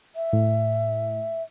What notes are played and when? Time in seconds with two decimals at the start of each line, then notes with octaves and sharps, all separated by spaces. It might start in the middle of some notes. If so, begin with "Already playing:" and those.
0.16 E5
0.33 A2